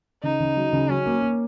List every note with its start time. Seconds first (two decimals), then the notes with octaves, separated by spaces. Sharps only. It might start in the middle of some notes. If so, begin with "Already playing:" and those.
0.23 C#3 D#4
0.40 C#3
0.56 F#3
0.73 C#3
0.89 F#3 C#4
1.06 A#3
1.22 A#3